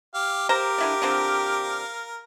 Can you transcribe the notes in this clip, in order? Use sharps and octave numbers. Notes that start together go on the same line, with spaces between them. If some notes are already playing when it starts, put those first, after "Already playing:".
G4 F5
G4 A#4 C5 F5 A#5
D3 E4 D5
D3 F3 C4